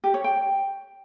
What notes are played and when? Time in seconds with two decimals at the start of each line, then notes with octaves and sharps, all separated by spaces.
0.04 G4
0.14 C#5
0.24 G5